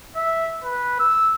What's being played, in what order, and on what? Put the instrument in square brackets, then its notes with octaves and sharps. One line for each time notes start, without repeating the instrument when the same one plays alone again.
[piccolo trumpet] E5
B4
E6